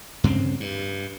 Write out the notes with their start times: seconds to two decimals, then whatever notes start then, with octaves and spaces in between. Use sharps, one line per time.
0.24 G2 C#3 C4
0.60 G2